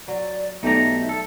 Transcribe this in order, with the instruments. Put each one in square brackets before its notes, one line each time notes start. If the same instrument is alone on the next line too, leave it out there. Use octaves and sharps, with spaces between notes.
[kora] F#3 [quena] D5
[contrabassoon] B1 [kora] A3 D5 [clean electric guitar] D#4 G4 A#5 [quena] E5
[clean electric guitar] A4